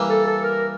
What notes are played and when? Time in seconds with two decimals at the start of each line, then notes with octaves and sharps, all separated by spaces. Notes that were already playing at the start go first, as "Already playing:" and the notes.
Already playing: E3 G3 A#3
0.09 A4
0.26 A4
0.43 A#4